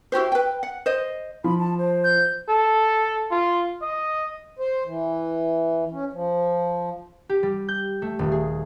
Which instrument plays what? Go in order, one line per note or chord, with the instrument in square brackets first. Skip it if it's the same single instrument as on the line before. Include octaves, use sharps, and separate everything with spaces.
[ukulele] E4 F#4 G4 C5
B4 G5
F#5
C5 D#5
[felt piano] F3 [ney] B5
[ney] A5
C5
[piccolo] G6
[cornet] A4
F4
D#5
[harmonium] C5
E3
C#4
F3
[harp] G4
G3
G6
A3
D#1
G#4